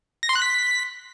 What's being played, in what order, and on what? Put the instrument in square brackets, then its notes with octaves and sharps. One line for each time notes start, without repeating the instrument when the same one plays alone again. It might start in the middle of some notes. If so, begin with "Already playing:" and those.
[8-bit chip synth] A#6
C6
F#6
B6